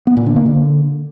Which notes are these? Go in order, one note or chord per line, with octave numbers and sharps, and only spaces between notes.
B3
A#2
D3
A#3
D3